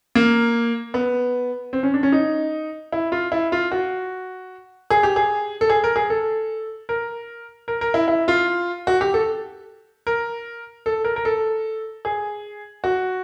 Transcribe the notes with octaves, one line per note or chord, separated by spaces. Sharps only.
A#3
B3
C4
C#4
D4
C#4
D#4
E4
F4
E4
F4
F#4
G#4
G4
G#4
A4
G#4
A#4
G#4
A4
A#4
A#4
A#4
E4
E4
F4
F#4
G4
A4
A#4
A4
A#4
A#4
A4
G#4
F#4